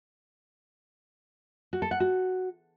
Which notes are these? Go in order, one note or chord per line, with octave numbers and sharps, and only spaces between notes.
F#4
A4
F#5
F#4